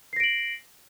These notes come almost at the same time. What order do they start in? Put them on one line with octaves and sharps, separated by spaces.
C7 A#6 D7 F#7